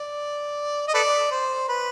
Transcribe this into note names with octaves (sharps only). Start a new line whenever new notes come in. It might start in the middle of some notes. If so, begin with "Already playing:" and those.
Already playing: D5
D#5
A4 B4 D5
C5
B4